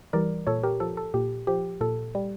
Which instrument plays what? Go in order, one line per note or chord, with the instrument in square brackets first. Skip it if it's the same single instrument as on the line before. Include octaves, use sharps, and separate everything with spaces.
[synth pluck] E3 G3 A#4 D5
A#2 A4 C#5
G4 A#4
F3 A4
A4
A#2 G4
F3 G4
A#2 A4
G3